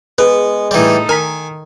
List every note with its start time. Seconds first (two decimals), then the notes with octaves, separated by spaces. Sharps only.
0.18 G#3 B3 G#4 B4
0.71 A2 E3 G3 D#4 A4
1.09 D#3 A#4 G#5 A#5 B6